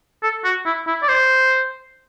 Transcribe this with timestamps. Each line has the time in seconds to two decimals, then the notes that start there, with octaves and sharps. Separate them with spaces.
0.23 A4
0.44 F#4
0.66 E4
0.87 E4
1.02 D5
1.08 C5